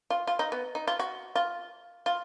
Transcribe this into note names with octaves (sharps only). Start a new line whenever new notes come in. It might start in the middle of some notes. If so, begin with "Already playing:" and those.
F4
F4
D#4
B3
D#4
F4
F#4
F4
F4